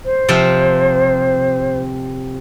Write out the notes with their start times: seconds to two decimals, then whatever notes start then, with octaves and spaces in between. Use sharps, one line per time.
0.05 C5
0.29 C3 F3 C4